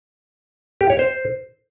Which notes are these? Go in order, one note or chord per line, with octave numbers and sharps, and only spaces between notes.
G4
C#5
C5